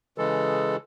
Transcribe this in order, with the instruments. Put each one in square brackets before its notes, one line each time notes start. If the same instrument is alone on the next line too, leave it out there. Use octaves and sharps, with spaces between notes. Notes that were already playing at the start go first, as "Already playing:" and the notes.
[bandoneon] C#3 E3 G#3 A4